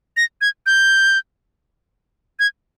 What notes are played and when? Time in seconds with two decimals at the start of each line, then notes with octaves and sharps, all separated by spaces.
0.17 A#6
0.41 G#6
0.66 G6
2.39 G#6